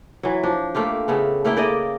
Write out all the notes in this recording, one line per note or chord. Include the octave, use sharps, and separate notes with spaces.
E3 F#3
F3 D4
A3 A#3 F4 G4
C#3 A3 B3
A3 A#3 E4 G5
C#3 A#3 D5 D#5